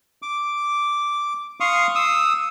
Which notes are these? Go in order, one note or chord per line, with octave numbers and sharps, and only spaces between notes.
D6
F5 C6 C#6 D#6
D#6 E6